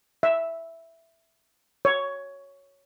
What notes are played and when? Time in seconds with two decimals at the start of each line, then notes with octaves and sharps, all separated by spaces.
0.23 E5
1.85 C#5